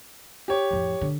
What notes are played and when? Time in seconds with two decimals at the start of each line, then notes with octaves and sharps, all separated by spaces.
0.48 G4 C#5
0.71 A1 F2
1.01 D3